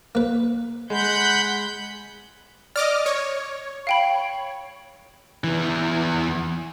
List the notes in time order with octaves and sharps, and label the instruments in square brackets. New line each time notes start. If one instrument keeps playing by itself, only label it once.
[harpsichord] A#3 B4
[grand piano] G#3 [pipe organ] F#5 B5 G6
[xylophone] D5 [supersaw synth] D#5 D6 F6
[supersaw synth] C#5
[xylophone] F5 G5 B5
[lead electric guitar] E2 E3